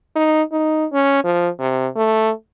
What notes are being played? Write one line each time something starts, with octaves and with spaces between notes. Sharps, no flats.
D#4
D#4
C#4
F3
C3
A3